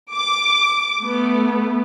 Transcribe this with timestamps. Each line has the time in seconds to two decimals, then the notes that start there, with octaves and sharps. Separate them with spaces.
0.13 D6
1.03 A3 B3